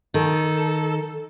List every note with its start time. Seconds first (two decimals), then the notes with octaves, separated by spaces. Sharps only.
0.14 D#3 A4